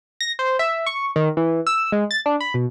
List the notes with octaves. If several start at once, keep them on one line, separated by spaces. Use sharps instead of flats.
A#6
C5
E5
C#6
D#3
E3
E6
G#3
A6
D4
B5
B2